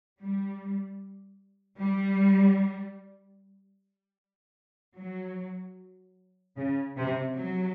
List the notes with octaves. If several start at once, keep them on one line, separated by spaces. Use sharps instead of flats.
G3
G3
F#3
C#3
C3
F#3